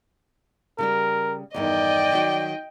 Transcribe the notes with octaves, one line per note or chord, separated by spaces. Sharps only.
C#3 G3 G4 A#4
E2 G2 D#3 D5 D#5 G5
D#3 F#3 F#4